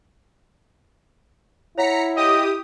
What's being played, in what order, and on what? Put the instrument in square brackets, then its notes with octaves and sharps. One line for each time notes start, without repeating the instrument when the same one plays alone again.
[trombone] E4 [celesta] C#5 F#5 [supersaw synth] A#5 B6 C#7
[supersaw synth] G4 D#6 [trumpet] D#5